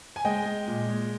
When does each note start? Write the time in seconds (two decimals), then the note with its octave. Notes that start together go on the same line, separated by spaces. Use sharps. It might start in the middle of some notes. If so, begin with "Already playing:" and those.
0.16 G#5
0.25 G#3 D#5 G5
0.46 G#3
0.68 A#2
0.89 G#3